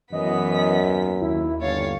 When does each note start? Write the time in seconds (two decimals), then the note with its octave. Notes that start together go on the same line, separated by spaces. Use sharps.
0.12 F#2 E3 B3 D#5 B6
0.84 D#2
1.21 D#2 E4
1.61 G1 C#5 F5 A6